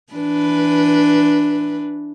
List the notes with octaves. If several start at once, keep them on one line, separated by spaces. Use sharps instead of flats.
E3 D4 B4